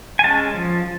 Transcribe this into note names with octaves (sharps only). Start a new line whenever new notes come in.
G#5
G#3 C#4 A5
F3